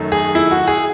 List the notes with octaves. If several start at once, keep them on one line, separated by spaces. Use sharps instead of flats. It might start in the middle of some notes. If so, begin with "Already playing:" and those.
Already playing: F#2 D#3 A3
G#4
E4
F#4
G#4